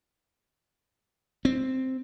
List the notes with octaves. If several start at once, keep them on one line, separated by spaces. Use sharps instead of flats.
C4